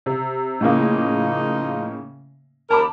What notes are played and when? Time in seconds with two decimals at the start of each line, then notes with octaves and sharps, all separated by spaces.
0.06 C3
0.61 A2 C#3 F3 A#3 D#4
2.71 D#2 D#4 A#4 A5 B5 D6